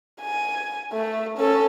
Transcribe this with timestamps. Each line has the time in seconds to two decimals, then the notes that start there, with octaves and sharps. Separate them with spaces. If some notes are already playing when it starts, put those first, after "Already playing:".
0.21 G#5
0.92 A3
1.38 C#4 A4